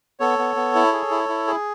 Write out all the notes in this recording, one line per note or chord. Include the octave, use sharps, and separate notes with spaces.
B3 A4 C#5
B3
B3
E4
G#4
E4
E4
G#4